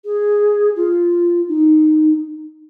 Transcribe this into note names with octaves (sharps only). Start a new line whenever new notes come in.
G#4
F4
D#4